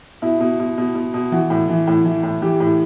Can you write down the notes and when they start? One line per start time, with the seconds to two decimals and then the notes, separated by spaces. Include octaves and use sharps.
0.22 B2 E4
0.40 B2
0.59 B2
0.78 B2
0.95 B2
1.14 B2
1.32 E3 F#4
1.50 A2
1.69 E3
1.87 A2
2.05 E3
2.23 A2
2.42 E3 G4
2.60 A2